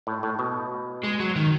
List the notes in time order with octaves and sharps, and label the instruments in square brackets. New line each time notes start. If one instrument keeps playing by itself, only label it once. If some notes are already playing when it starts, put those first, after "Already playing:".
[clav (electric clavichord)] A2
A2
B2
[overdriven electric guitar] G#3
F#3
D#3